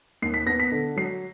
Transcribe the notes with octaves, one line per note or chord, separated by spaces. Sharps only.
D#2 C7
B6
B3 A#6
B6
D3
F#3 C7